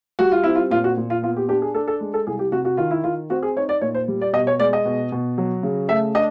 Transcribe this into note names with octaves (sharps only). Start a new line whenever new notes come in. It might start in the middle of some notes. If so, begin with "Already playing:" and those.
G3 F#4
F4
C4 E4
F4
A#2 F4
F#4
A#2
F4
B3 F4
G4
D4 G4
G#4
D4 A4
A4
G#3
A4
C2 G#4
G4
C3 F#4
F#4
D#3 F4
E4
D#3 F4
C4 F#4
G#4
D#4 C#5
D5
A#2 C#5
C5
G3
D5
B2 D#5
C#5
G#3 D5
D#5
B2
B2
F#3
C#3
A3 E5
D4 D#5